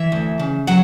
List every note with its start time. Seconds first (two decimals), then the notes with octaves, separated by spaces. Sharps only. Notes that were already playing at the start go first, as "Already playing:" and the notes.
Already playing: E3 E5
0.12 D2
0.39 C#3
0.67 F#3 F#5